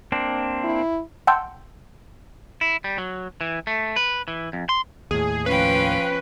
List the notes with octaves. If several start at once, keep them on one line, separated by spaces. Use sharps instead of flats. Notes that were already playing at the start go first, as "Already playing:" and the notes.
A#3 C4 D4
E4
F#5 G5 A5 C6 E6 G6
E4
G3
F#3
E3
A3
B4
E3
F2
C6
D#2 A2 G#4
F3 C#4 B4 F5 G5